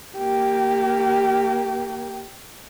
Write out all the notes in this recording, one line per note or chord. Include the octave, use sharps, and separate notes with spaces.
A#3 G4